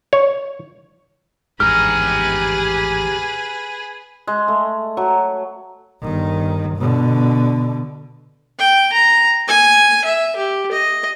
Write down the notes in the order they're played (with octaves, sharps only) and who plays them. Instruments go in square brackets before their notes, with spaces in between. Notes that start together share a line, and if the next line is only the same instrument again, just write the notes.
[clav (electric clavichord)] C#5
[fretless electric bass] A1 F2 G#2 [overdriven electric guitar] G4 A#5 [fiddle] G#4 B4 [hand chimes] F6
[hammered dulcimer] G#3
A3
F#3
[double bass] G1 D#3
B2 D3
[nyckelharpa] G5
A#5
G#5
E5
G4
D#5